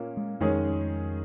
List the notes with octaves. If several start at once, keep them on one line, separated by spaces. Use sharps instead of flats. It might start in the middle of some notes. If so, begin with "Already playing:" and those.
Already playing: A#2 A#3 C#4
G#3
F2 D#3 G#3 C#4 G#4